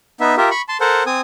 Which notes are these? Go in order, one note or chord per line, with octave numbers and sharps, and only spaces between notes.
B3 D#4 E5
F4 G4 A#4 E5
B5 C#6
A5 C6
A4 A#4 C5 F#5
C4 G#5 D#6